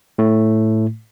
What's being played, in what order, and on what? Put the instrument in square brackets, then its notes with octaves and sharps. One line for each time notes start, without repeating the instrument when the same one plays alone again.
[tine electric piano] A2 A3